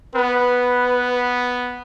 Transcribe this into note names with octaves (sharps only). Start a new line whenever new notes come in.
B3 B4